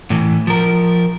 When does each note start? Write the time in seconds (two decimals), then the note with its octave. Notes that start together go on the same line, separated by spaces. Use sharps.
0.10 A2 E3
0.47 F3 A#4